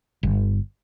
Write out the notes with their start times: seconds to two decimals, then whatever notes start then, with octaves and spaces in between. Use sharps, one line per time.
0.23 G1